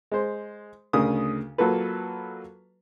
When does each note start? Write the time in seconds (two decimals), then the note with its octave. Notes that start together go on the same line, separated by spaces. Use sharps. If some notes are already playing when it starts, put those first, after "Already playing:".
0.12 G#3 C5
0.93 D2 C#3 A#4 D#6
1.58 F#3 A#3 F4 A4 B4